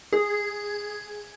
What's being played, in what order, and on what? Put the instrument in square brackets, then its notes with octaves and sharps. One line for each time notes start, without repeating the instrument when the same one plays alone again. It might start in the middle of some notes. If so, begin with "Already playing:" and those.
[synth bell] G#4